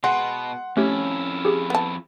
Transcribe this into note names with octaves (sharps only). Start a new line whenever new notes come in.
B2 G#3 F#5 C6
F2 A3 C#4 E4 G4
G4 G#4
B3 A5